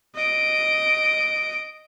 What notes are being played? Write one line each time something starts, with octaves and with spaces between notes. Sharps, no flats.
D#5 D7